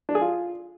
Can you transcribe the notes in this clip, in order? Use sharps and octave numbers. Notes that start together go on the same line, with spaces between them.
D4
G#4
F4